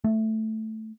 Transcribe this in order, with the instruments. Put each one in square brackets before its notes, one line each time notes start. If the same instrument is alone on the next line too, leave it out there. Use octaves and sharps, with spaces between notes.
[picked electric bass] A3